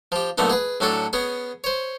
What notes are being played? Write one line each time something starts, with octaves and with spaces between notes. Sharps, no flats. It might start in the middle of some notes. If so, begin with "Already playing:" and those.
F3 G4
F#2 A#2 D3 A3 B3 D#4
G#4 B4
A2 F#3 C#4 D4 A4
B3 C#4 G#4
C5 C#5